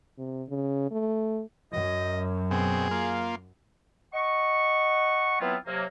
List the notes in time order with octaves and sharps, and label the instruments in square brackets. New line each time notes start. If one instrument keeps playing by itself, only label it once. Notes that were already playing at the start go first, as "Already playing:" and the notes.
[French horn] C3
C#3
A3
[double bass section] F#2 [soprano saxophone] D#5
[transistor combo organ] B2 C4 [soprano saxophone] G#4
[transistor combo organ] A#3 F4
[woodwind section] D#5 F#5 C#6
E3 F#3 B3 C4 E4 F4
C3 F#3 A#3